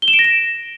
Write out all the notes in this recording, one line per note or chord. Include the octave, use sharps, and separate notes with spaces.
G7
E7
D7
A#6
E7